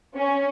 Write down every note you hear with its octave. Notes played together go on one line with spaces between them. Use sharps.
C#4